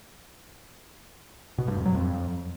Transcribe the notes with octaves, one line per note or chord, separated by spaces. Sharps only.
B2
G2
F2
F#3
F2